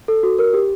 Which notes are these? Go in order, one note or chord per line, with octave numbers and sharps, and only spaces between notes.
A4
F#4
A#4
G4